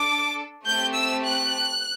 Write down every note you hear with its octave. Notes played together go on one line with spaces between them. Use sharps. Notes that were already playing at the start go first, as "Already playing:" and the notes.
Already playing: D4 A4 D6
A3 C4 G4 G6
E6
F#6